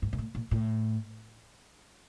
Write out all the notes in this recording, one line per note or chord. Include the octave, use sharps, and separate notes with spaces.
G#2
A#2
A2
A#2
A2